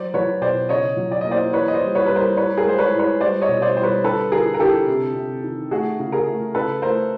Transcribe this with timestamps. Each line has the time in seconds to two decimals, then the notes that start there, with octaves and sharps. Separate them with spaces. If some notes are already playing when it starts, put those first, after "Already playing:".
Already playing: F#3 C5 D5
0.14 F#3 B4 C#5
0.41 B2 C5 D5
0.69 C#3 C#5 D#5
0.97 F#3
1.11 D5
1.21 A#3 D#5
1.31 C5 D5
1.53 E3 B4 C#5
1.68 D#5
1.74 C5 D5
1.81 G3
1.95 B4 C#5
2.06 G3 B4
2.16 A#4 C5
2.36 A2 B4 C#5
2.57 G#4 A#4
2.65 G#3 C5
2.78 B4 C#5
2.93 A2
2.99 B4 C#5
3.20 G3 C5 D5
3.41 C#5 D#5
3.48 B2
3.62 C5 D5
3.77 G3 C5
3.83 B4 C#5
4.04 D3 A4 B4
4.32 D3 G#4 A#4
4.54 A#4
4.59 D3 G4 A4
4.87 C3
5.15 C3
5.43 D#3
5.71 A3 F#4 G#4
5.99 C#3
6.12 G#4 A#4
6.27 A3
6.55 C#3 A4 B4
6.82 A3 A#4 C5